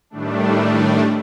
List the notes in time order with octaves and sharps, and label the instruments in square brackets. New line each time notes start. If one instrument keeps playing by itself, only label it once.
[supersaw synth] A2 D#3 G3 A3 D4